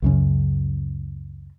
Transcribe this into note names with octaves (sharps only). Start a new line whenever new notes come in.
C#2 F#2 C#3